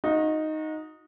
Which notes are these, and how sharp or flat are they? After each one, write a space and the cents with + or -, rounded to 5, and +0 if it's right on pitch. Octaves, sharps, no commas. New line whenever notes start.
D#4 +0 F#4 -35